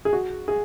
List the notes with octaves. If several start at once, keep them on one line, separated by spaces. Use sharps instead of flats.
G#4
F#4
G#4